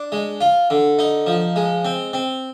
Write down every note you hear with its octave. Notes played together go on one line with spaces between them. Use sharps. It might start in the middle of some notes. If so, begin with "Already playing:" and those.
Already playing: D4
G#3
F4
D3
D#4
F3
G#3
C4
C4